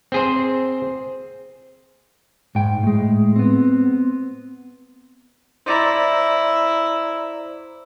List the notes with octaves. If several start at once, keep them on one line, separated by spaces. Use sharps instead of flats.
C4 G#4 C5
G#2 G5
A2 G#3
B3 C4
E4 C5 D5 A#5